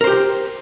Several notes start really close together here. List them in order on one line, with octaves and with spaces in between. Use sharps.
A#4 C5 G4